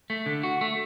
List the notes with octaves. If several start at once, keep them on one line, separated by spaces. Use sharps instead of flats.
A3
D3
F#4
A3